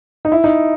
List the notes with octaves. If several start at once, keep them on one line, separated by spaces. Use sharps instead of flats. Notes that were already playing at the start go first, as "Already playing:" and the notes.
D#4
E4
D#4